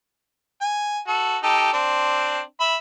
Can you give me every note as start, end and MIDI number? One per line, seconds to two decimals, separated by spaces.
0.61 0.99 80
1.07 1.38 66
1.07 1.38 69
1.43 1.73 63
1.43 1.73 67
1.43 1.73 69
1.73 2.40 60
1.73 2.40 62
2.60 2.77 76
2.60 2.77 83